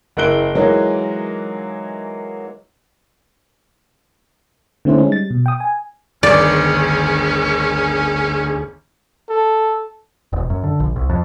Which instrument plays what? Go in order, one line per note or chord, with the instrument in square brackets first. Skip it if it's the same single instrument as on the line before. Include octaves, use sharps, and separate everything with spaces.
[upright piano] F#1 A#3 E4 F#6 D7 G7
E3 F#3 G#3 A#3 D#4
[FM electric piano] D3 A3 C4 C#4 E4 C5
G#3 C#4 D#4
G3 A6
B2
G5 D#6
G#5
[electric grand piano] G1 D#3 [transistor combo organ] D2 G#4 [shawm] C#4 [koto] D5
[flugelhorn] A4
[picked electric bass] E1
F#2
D3
A#1
C2
F2